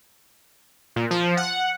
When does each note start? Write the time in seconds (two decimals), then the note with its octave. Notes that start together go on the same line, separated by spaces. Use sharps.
0.96 A#2
1.11 F3
1.37 F#5